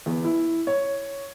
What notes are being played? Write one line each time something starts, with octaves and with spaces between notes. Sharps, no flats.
E2
E4
C#5